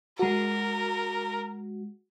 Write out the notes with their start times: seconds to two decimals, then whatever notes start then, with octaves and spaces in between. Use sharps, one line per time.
0.19 G#3 F#4 A#4